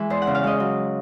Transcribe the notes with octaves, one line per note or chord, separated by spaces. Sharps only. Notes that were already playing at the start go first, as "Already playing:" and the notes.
Already playing: E3 G#3
E2 C5
F#5
C#3
F5
G#3 D#5
F#3